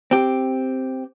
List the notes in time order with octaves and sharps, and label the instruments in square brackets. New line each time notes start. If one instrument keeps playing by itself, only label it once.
[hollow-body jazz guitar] C4 G4